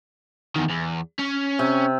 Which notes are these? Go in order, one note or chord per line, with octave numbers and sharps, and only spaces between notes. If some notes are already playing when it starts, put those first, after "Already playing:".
E2 D#3
E2
C#4
C3